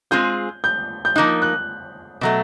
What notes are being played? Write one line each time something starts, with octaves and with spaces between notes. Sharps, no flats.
G#3 C4 F4 G#4 G6
G6
G6
F3 A#3 D#4 F#6
F#6
B2 F#3 A3